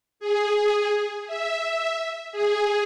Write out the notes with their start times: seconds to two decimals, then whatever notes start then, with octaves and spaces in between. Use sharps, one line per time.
0.20 G#4
1.27 E5
2.32 G#4